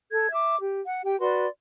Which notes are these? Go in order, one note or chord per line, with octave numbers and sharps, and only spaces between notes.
A4 G#6
E5 D6
G4
F#5
G4 G5
F#4 B4 D5 C6